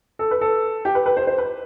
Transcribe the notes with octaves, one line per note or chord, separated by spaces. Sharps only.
A4
B4
A4
G4
B4
B4
C5
C5
B4